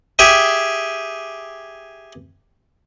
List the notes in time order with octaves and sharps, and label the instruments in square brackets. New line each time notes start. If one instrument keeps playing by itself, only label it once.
[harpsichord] G4 G#4 E5 G#5